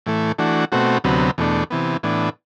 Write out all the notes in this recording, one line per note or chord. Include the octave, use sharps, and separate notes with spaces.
A2 E3 A3
E3 A3 D4 F#4
B2 A3 C4 F#4
D2 C3 F#3 B3
E2 B2 A3 D4
C3 E3 B3
A2 E3 B3 D4